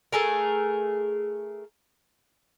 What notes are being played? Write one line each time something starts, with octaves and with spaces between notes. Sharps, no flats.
A3 G#4 A#4